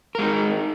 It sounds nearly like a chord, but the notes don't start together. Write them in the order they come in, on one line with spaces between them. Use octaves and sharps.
A#4 G#3 D#4